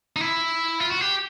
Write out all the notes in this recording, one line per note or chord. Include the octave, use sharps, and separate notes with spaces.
D#4
E4
F4
F#4
G4